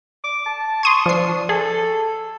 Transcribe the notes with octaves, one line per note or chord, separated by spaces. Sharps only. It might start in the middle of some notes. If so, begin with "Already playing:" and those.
D6
A5
C6 C#6 D#6 G#6
F3 D4 C7
G#4 A4